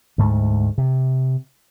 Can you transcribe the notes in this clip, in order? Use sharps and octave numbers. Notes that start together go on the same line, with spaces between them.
D2 G#2 A3
C3